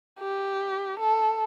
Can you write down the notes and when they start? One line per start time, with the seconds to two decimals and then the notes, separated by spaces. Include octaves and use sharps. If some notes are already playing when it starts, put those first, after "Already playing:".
0.19 G4
0.99 A4